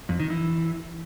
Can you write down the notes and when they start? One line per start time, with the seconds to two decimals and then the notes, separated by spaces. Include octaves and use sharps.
0.09 F2
0.20 D#3
0.30 E3